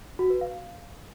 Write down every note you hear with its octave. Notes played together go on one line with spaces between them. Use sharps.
F#4
B4
F5